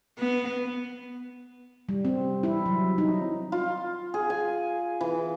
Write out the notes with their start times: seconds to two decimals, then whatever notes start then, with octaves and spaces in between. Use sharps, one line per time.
0.19 B3
1.89 G3
2.05 C4
2.43 E4
2.66 F#3
2.98 D#4
3.52 F4
4.14 G#4
4.30 G#5
5.01 E3